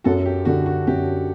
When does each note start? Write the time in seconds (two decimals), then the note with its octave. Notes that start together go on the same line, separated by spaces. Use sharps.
0.04 F#2 F#4 A4
0.26 G4
0.45 D3 F#4
0.66 F#4
0.87 F#2 G4